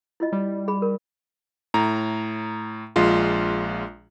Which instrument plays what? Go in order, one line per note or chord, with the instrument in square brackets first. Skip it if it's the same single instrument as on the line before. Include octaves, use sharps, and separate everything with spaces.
[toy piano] E4 F4 D#5
[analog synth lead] G3
[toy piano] G#4 B5
A#4
[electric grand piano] A2 A#5
A#1 G#3 F4 C6